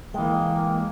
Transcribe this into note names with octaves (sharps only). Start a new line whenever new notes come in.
E3 G#3 A#3 G5